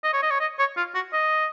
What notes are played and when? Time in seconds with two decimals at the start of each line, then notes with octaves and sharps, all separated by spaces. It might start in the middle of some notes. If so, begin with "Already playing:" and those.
0.04 D#5
0.13 C#5
0.23 D#5
0.31 C#5
0.40 D#5
0.59 C#5
0.77 F4
0.95 F#4
1.13 D#5